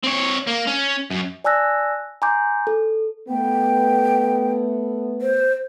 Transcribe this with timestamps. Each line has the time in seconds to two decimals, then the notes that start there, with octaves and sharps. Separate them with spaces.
0.04 C4 C#5
0.47 A#3
0.67 C#4
1.10 F#2
1.44 D5 G#5 A5 E6 F#6 A#6
2.22 G#5 A#5 C6 D6 G6
2.67 A4
3.29 A3 B3 G5
5.22 C5